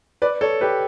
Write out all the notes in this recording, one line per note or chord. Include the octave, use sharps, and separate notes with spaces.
B4 D5
A4 C#5
G4 B4